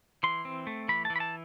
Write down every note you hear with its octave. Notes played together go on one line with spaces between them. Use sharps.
E3 C6
C4
A3
E3 B5
E3 A5
B5
A5